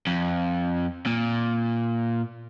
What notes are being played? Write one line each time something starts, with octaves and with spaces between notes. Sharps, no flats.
F2
A#2